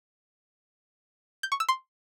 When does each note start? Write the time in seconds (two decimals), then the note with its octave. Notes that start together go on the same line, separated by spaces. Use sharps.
1.43 G6
1.52 C#6
1.60 E6
1.69 C6